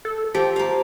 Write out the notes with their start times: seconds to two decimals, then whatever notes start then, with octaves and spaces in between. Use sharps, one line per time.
0.05 A4
0.34 F3 G4 G5
0.56 A#3 F5